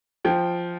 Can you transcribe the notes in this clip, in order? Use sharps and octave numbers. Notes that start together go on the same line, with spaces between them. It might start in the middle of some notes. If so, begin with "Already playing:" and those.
F3 G5